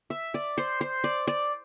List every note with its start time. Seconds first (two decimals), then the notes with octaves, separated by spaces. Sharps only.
0.10 E5
0.34 D5
0.58 C5
0.81 C5
1.04 D5
1.27 D5